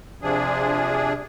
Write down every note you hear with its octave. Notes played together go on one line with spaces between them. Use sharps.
C3 F3 D4 G#4